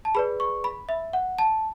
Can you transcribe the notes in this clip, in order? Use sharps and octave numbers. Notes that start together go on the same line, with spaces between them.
A5
G#4 B4 D5 B5
C#6
B5
E5
F#5
A5